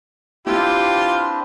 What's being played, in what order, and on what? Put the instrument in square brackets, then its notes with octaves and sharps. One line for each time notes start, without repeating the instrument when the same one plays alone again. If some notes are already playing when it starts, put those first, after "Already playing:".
[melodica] C4 D4 B4 [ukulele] E4 [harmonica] F4 [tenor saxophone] G4